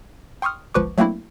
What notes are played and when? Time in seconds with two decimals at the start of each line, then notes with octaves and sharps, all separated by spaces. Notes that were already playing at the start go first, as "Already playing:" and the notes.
0.42 G5 C6 C#6 D#6 F6
0.74 G1 C#2 F3 B4 C#6 D6
0.98 F#3 A3 A#3 C4 D4 E4